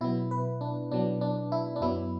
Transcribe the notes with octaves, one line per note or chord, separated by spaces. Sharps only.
B2 F#3 B3 E4
B4
D4
B2 F#3 B3 D4
D4
E4
D4
F#2 F#3 B3 E4